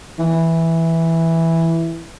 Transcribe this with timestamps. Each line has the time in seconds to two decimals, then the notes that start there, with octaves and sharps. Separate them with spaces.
0.19 E3